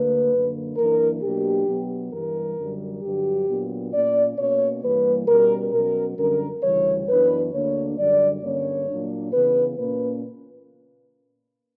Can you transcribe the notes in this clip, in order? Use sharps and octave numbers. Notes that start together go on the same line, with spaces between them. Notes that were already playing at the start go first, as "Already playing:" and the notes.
Already playing: D2 D3 A#3 D4 B4
F#2 D3 A#3
F#2 E3 A#3 D4 A#4
B2 F#3 A#3 D4 G4
B2 F#3 B3
G2 E3 G3 A#4
F#2 D3 G3
G2 D3 F#3 G4
A#2 F#3 B3 D4
A#2 A#3 C#4 D5
B2 A#3 C#4 C#5
G2 E3 G3 A#3 B4
B2 G3 C#4 A#4
B2 F#3 C#4 A#4
F#2 D3 G3 C#4 A#4
D2 C#3 E3 G3 C#5
F#2 E3 B3 D4 B4
D2 D3 A#3 D4 C#5
F#2 D3 G3 D5
G2 D3 A#3 C#4 C#5
A#2 F#3 A#3 D4
C#3 E3 B3 B4
A#2 A#3 C#4 B4